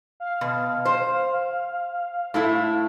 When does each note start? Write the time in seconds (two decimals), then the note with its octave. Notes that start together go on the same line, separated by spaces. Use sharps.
0.20 F5
0.41 B2
0.85 C5
2.34 A2 A3 E4